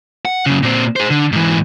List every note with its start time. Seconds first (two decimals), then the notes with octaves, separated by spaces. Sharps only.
0.25 F#5
0.46 F#2 C#3
0.63 A#2 C4
0.96 G#4 C5
1.10 D3
1.32 G#2 E3